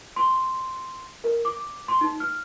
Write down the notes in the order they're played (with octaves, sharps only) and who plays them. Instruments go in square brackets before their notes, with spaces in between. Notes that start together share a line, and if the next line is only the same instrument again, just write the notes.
[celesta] C6
A#4
D6
C6
D#4
F6